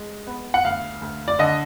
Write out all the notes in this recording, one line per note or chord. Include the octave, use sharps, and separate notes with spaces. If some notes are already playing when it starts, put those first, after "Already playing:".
Already playing: G#3
B3
F#5
D2 F5
D2
D5
D3 D#5